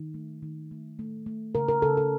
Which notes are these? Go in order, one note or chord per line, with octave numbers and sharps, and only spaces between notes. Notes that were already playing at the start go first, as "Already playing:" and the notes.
Already playing: D#3
A3
D#3
A3
A3
A3
C#3 A#4
A#4
C#3 A4
A4